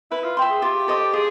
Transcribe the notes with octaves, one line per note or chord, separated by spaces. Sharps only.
E4 B4
F4
E5 G5 C6
G#4
F4 G4
A4 C5 D#5
F4 G#4